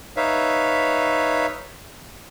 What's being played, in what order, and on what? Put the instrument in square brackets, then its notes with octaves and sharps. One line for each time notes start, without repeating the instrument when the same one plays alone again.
[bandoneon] D#4 B4 C#5 E5 F5